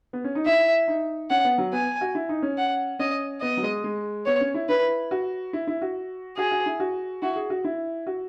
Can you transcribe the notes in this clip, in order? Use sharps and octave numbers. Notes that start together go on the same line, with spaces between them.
B3
C#4
D#4
E4 E5
D#4
C#4 F#5
B3
F#3
B3 G#5
F#4
E4
D#4
C#4
F#5
C#4 D#5
B3 D#5
F#3
G#3
G#3
B3 C#5
C#4
E4
E4 B4
F#4
E4
E4
F#4
F#4 G#4
F#4
E4
F#4
E4 F#4
G#4
F#4
E4
F#4